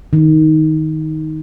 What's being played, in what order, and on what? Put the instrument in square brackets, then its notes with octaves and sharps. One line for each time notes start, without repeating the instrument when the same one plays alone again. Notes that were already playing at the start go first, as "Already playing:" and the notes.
[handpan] D#3